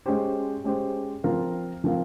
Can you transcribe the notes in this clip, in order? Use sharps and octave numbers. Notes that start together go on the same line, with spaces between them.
G#3 C#4 G4 C5
G#3 C#4 G4 C5
F3 C4 F4 A#4 F5
F3 C4 F4 A#4 F5